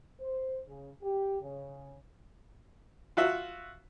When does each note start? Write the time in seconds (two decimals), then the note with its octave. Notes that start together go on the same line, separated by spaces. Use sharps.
0.20 C5
0.67 C#3
1.02 G4
1.41 C#3
3.17 F4 F#4 E5